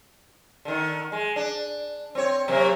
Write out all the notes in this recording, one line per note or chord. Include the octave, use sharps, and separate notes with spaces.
D3 D#3
G#3
D4
C4 C#5
C3 F#3 A#3